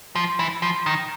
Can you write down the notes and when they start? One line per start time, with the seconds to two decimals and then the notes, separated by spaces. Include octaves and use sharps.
0.15 F3
0.39 E3
0.62 F3
0.86 D#3